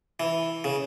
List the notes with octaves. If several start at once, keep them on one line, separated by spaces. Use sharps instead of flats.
E3
C#3